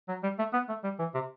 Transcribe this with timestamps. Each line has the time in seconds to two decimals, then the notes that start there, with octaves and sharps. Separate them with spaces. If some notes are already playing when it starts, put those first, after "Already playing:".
0.09 F#3
0.23 G3
0.39 A3
0.53 B3
0.69 A3
0.84 G3
0.99 E3
1.14 C3